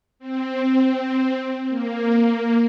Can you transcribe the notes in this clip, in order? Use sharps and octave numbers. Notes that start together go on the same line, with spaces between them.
C4
A#3
A#3